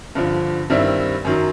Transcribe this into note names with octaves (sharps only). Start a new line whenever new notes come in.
G2 D3 F3
G2 D#3 G3 C4 E4
F#2 D#3 F#3